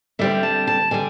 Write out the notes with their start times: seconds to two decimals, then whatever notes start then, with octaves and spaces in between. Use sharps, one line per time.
0.19 D3 G3 C4 E5
0.43 A5
0.67 A5
0.91 D3 G3 G#5